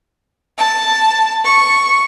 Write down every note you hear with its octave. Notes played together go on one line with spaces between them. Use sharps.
A5
C#6